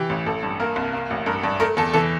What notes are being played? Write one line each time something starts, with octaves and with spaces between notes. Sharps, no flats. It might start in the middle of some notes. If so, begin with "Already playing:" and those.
Already playing: E3 G4
A1
A1 A4
G2
A#3 A#4
C2
A#3
A1
G2 A#4
G2 D5
A3 A#4
E2 A4
E3 A4